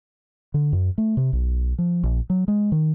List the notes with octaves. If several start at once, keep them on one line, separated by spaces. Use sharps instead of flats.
D3
F#2
A3
C3
B1
F3
A#1
F#3
G#3
D#3